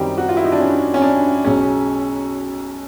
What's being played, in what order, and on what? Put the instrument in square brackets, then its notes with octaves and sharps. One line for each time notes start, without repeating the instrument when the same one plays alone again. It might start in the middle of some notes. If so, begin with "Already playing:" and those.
Already playing: [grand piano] F#2 D#3 G3 C4 D#4 [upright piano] G4
[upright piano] F#4
F4
E4
D#4
D4
C#4
C#4
D4
[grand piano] B1 B2 G#3 [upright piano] C#4